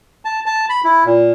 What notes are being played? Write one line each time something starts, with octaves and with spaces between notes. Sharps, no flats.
A5
A5
B5
E4
A#2